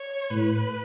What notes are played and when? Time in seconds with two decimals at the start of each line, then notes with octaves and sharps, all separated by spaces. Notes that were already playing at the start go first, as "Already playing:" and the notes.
Already playing: C#5
0.30 A2 B4